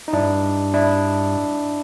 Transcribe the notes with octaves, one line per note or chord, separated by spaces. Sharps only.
D#4
G2 D4 E4
D4 E4